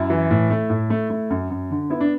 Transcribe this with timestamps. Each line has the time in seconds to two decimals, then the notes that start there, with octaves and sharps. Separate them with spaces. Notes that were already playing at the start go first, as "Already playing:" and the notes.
Already playing: F#2 E4
0.10 E3
0.31 A2
0.50 A3
0.70 A2
0.90 A3
1.10 A3
1.30 F#2
1.50 F#2
1.71 D3
1.90 B3 E4
2.00 D4